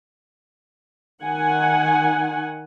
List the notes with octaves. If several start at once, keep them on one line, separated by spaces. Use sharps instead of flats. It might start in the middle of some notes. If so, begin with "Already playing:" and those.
D#3 F#5 G#5